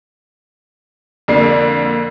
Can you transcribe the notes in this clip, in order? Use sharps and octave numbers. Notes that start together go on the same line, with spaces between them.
F2 D3 A#3 D4 C7